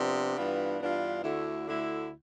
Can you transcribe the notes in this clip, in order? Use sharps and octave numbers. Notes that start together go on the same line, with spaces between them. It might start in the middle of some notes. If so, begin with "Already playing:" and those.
Already playing: C3 F3 B3 D4
G2 E3 B3 D4 F4
G2 E3 B3 D4 F4
D2 D3 A3 E4
D2 D3 A3 E4